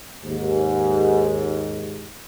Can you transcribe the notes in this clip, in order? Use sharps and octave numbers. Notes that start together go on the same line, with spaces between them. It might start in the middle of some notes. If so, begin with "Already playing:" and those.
D#2 G#2